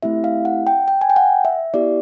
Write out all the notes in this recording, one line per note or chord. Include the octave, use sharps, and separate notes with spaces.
A3 C4 E4 G4 E5
F5
F#5
G5
G5
G#5
G5
F#5
E5
B3 E4 G4 D5